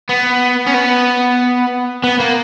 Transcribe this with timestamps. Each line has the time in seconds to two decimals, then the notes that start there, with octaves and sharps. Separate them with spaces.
0.09 B3
0.66 C#4
0.74 B3
2.04 B3
2.20 A#3